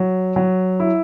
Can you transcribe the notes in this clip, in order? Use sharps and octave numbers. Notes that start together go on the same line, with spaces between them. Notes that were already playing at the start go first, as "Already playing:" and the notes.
Already playing: F#3
F#3
E4